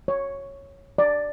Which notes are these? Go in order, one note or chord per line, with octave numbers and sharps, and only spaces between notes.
C#5
D5